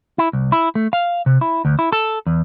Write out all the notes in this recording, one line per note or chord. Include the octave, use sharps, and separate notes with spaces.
E4
C2
E4
A3
F5
C3
E4
D2
E4
A4
E2